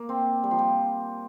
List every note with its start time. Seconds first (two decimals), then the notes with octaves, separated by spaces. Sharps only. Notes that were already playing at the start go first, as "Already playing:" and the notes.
Already playing: A#3
0.09 C4
0.44 G3
0.51 F3
0.59 G3